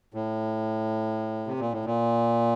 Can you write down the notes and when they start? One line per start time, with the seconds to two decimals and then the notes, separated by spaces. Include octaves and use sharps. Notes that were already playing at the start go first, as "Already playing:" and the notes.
0.14 A2
1.47 C3
1.60 A#2
1.72 A2
1.85 A#2